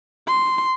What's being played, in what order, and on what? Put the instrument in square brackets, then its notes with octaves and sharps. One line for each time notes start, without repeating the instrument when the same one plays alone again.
[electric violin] C6